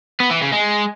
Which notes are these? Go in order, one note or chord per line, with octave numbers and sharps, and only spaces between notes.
B3
E3
C#3
G#3